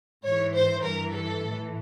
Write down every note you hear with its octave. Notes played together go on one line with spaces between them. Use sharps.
G#2 E3 C#5
C5
G2 E3 A#4
A4
A2 E3